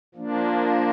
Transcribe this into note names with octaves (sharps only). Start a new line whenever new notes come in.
F3 A#3 D4